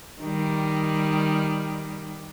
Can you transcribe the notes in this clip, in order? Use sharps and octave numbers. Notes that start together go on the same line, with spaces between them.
D#3 G3